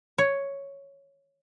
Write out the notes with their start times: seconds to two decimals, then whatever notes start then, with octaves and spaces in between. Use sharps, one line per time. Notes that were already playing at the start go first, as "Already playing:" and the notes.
0.18 C#5